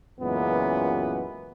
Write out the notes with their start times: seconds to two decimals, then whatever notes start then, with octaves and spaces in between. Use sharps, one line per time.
0.19 C#2 F#2 A#2 E3 B3